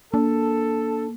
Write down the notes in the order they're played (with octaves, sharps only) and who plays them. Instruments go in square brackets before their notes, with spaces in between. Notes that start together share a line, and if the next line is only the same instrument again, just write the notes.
[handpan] A#3 [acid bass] D4 [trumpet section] A4